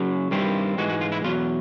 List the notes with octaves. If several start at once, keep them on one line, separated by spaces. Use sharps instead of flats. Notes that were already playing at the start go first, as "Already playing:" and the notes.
Already playing: F#2 C#3 F#3
G2 D#3 G3 C4 E4
G#2 E3 G#3 F#4
F#4
F4
E4
E2 B2 F#3 F4